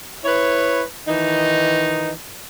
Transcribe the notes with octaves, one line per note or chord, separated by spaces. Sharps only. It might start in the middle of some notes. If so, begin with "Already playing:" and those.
E4 B4 C#5
D#3 E3 D#4